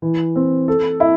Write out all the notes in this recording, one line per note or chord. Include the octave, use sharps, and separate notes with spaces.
E3
C4
A4
E4